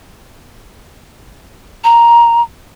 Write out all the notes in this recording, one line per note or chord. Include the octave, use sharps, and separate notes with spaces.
A#5